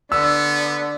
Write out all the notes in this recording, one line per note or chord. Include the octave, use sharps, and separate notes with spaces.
D3 B3 E6